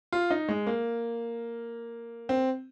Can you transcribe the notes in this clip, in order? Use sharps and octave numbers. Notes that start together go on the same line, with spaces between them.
F4
D#4
G#3
A#3
C4